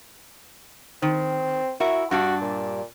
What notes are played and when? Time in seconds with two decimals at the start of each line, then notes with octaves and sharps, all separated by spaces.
1.02 D#3 C4
1.80 E4 F#4 A#4 E5
2.11 G2 G3 D4 F#4
2.42 A#2